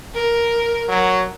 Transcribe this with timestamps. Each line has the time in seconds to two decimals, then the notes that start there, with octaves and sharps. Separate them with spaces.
0.14 A#4
0.88 F#3